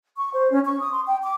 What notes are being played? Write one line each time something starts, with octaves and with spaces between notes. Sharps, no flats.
C#6
C5
C#4
C#6
D#6
C6
G5
D6